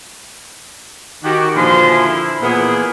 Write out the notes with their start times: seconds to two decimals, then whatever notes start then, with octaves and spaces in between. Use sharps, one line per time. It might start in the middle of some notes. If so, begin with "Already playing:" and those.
1.23 D#3 F#4 G4
1.55 A#2 D3 F3 B4 G#5 C6
1.91 E4
2.41 A#2 E3 B3 G#4